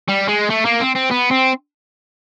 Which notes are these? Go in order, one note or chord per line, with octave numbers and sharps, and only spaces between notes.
G3
G#3
A3
A#3
C4
C4
B3
C4